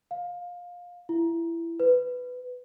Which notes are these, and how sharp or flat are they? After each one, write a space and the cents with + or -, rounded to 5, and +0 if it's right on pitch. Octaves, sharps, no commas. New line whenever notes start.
F5 +20
E4 +20
B4 +10